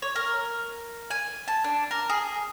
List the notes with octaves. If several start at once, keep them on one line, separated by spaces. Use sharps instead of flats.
C#5
A#4
G#5
A5
D4
A#4
G#4